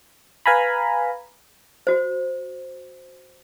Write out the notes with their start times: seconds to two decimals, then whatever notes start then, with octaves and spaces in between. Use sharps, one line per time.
0.46 B4 F5 G#5 A#5 B5
1.87 F#4 C5